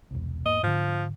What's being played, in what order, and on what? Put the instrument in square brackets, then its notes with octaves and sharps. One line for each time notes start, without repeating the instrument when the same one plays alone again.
[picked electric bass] E1 C2
[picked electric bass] E2 G#2 A#3 [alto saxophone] D#5
[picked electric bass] G#2 D3 [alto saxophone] F3